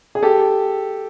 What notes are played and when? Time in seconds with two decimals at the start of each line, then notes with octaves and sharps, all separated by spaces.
0.15 G#4
0.23 G4 A4